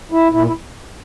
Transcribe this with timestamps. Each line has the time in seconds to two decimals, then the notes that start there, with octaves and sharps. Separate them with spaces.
0.12 E4
0.32 A#2 E4
0.47 E4